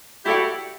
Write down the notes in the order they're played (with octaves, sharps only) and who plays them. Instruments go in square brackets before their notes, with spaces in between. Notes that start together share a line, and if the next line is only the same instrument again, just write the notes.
[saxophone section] E4 G4 [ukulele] F#4 A4 D5 F#5